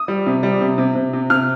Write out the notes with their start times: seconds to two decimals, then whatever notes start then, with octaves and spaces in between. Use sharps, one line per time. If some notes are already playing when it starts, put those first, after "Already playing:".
Already playing: D#6
0.08 G3
0.26 C3
0.43 G3
0.61 C3
0.78 C3
0.95 C3
1.13 C3
1.30 C3 F6